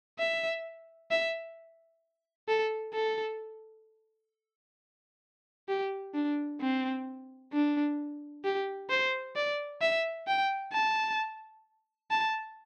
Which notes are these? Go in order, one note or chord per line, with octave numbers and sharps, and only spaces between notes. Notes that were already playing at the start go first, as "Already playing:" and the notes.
E5
E5
A4
A4
G4
D4
C4
D4
G4
C5
D5
E5
G5
A5
A5